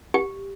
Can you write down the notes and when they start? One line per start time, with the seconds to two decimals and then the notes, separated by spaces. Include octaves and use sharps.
0.14 G4